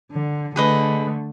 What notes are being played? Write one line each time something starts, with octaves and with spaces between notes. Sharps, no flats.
D3
D3 A3 G#4 B4 D#5